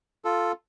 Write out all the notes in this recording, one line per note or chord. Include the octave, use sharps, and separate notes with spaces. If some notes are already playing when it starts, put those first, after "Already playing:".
F4 A4